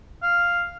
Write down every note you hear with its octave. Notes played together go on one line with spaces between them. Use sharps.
F5